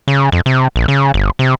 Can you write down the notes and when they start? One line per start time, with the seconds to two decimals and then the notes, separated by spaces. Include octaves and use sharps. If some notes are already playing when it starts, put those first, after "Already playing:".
0.08 C#3
0.32 F2
0.46 C3
0.76 A#1
0.88 C#3
1.14 G1
1.39 C3